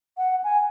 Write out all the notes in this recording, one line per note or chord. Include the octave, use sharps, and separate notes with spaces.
F#5
G#5